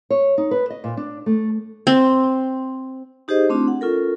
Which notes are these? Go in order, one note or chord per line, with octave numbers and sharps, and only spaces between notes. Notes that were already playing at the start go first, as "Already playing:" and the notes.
C#5
D#4
B4
D#5
A#2
D4
A3
C4
D#4 G4 G#4 C5 D#5
A3 C4 D4 E4 F#4
F#5
C#4 F4 A4 A#4